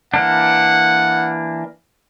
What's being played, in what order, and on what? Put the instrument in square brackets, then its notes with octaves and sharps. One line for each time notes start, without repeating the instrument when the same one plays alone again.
[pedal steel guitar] E3 A#3 D4 [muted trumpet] F#5